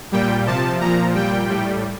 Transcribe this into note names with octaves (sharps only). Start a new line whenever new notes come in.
A#2 G3 G5
C3 F3 A5
A#2 F3 A#5
A#2 G3 G5
A2 G3